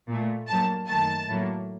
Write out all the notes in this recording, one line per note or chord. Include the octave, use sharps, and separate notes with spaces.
A#2 A3
G2 F#3 A#3 A5
F#2 D#3 A3 A5
A2 F#3 A#3